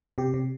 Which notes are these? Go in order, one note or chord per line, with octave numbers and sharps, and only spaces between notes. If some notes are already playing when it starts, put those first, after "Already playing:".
C3 G4
C3